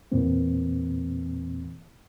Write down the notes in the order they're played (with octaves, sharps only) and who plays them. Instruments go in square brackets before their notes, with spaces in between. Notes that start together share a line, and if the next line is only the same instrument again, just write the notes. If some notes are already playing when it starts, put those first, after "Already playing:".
[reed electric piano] E2 A#2 E3 A#3 C4